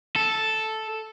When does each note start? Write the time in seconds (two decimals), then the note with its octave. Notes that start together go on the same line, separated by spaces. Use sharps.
0.16 A4